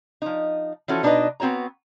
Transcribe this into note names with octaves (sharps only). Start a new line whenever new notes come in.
F3 D#4
E3 F3 C#4 F#4 A4
B2 D4 D#4 A#4 B4 D#5
B3 C4 F#4 C#5 A#5